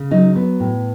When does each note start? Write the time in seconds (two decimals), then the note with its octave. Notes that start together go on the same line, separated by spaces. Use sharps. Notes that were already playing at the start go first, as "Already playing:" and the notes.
Already playing: C#3
0.11 F#3 D#4
0.36 B3
0.60 A2